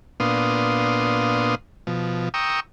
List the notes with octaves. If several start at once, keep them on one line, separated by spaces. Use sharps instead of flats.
A#2 B3 D4 F5 C6 D#6
B2 F3
G5 A#5 C#6 D#6 E6